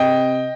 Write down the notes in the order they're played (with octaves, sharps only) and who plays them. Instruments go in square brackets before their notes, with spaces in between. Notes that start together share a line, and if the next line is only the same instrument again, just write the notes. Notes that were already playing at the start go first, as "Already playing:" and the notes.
Already playing: [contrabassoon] C3 [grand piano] D#5 G5